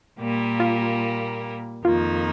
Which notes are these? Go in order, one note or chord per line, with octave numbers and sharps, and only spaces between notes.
A#2 G3 A#3
F4
F2 D#3 A#3 F4